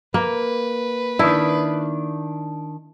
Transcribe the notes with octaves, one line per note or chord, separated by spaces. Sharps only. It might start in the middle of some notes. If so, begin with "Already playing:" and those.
A#3 B4
D#3 D4 E4